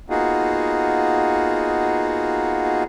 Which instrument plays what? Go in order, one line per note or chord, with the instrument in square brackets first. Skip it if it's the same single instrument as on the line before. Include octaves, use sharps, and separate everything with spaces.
[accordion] A#3 B3 D#4 F4 F#4 G#4